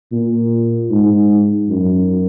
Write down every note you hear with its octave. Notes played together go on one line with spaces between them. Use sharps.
A#2
G#2
F#2